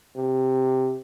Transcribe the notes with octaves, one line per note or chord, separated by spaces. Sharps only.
C3